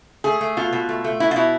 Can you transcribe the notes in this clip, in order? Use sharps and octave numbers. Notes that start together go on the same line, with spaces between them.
A3 G#4
A3
B2 F4
B2
A3
A3
B2 E4
F4
B2 E4